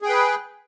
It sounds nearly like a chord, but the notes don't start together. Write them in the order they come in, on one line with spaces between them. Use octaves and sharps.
G#4 G5 B4